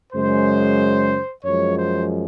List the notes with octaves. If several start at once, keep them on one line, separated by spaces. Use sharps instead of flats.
F#2 C#3 G#3 C5
F#2 F3 G#3 C#5
C5